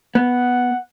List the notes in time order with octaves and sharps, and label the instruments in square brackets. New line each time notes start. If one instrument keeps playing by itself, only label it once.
[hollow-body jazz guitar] B3 [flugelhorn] F#5